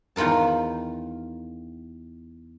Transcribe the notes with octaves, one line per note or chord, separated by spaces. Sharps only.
E2 D#3 F4 A#4 A5